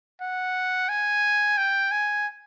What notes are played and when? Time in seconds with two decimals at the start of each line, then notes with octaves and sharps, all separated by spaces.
0.21 F#5
0.89 G#5
1.58 G5
1.91 G#5